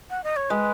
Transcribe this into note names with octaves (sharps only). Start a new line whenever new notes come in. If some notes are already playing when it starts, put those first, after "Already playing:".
F#5
D#5
C#5
G#3 B4